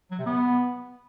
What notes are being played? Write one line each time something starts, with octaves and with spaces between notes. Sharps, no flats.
F#3
C3
B3